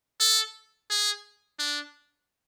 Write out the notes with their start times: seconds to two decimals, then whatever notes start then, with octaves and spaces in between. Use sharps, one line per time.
0.21 A4
0.90 G#4
1.59 D4